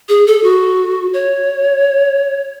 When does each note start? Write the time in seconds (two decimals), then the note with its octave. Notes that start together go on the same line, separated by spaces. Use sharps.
0.09 G#4
0.27 A4
0.44 F#4
1.14 C#5